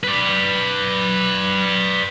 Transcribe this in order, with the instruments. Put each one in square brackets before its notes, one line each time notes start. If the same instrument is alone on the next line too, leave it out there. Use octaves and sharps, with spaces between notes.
[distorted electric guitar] B4 D5